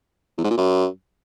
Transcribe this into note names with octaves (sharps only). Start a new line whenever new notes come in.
E2
G#2
A#2
F#2